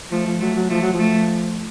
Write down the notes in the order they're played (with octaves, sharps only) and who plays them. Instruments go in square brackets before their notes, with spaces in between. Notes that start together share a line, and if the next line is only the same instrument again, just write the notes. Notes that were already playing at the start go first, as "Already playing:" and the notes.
[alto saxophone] F3 [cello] A3
[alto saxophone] F3
[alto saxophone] F#3 [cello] A3
[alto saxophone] F#3
[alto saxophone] F3 [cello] A3
[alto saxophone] F#3
F3
[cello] A3